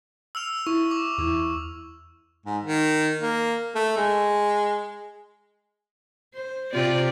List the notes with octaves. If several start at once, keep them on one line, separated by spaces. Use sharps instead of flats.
E6 F6 F7
E4 C#6
D6
E2 E4
G#2
D#3
A#3
A3
G#3
C5
C3 F4 D5